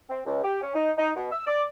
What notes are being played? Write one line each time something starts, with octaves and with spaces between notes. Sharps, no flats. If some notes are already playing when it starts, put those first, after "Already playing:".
C4
C#2
G4
C#4
D#4
D#4
B2
E6
D5